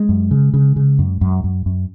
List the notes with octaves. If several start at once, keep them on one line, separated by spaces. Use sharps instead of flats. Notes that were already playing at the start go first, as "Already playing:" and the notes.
Already playing: G#3
F#2
C#3
C#3
C#3
F#2
F#2
F#2
F#2